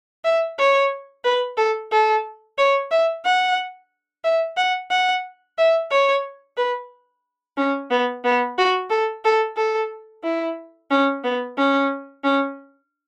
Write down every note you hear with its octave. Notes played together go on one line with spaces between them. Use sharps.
E5
C#5
B4
A4
A4
C#5
E5
F#5
E5
F#5
F#5
E5
C#5
B4
C#4
B3
B3
F#4
A4
A4
A4
E4
C#4
B3
C#4
C#4